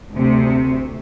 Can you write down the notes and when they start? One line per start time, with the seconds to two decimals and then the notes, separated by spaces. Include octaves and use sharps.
0.13 D2 C3